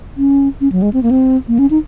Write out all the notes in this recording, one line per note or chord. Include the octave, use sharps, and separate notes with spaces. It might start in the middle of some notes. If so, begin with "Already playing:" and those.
C#4
C#4
F#3
G#3
C4
A#3
C4
A#3
C#4
D#4